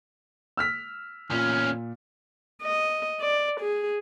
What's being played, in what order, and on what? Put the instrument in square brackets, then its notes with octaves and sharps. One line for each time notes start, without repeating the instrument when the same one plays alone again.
[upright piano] E6 F6 B6
[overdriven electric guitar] E2 C#4 [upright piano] A#2 [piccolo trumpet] F6
[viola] D#5
D5
G#4